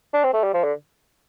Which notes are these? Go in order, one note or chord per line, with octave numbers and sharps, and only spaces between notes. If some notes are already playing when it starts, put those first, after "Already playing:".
D4
C4
A3
G3
F3
D3